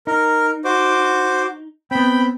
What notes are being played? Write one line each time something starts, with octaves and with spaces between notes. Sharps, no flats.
D#4 A#4
F#4 C5 D6
B3 C4 G5 B5